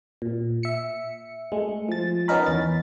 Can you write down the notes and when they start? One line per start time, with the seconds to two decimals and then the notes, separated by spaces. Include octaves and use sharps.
0.22 A#2
0.63 E5 C#7
1.52 G#3 A3
1.89 F3 A6
2.28 B3 C#4 D#4 A#4 B5
2.46 E2 A6